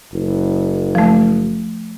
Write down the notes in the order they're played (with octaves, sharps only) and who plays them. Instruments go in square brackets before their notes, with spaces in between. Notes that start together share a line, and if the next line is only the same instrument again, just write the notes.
[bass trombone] F#1
[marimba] F3 A3